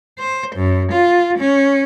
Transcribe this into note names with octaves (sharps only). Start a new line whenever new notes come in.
C5
F#2
F4
C#4